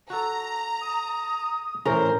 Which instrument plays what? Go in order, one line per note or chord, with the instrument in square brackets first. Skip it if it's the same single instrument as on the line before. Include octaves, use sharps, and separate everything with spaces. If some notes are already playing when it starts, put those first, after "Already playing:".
[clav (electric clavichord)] F#4 A4 [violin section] A#5
[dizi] D#6
[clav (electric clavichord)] A2 E3 C#4 [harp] A#4 [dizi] C5